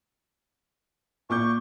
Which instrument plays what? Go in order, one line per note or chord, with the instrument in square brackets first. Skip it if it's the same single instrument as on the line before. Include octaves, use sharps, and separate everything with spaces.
[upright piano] A#2 D6 G6 [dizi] C#6